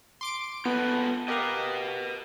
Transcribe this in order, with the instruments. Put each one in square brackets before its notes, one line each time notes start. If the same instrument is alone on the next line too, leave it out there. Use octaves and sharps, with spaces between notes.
[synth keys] C6 D6 D7
[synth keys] B3 [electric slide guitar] F4 A4 B4
[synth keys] G4 A#4 F5 [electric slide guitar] B4 D#5